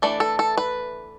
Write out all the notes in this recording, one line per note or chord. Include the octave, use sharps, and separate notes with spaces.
E3 A3 D4 D5
A4
A4
B4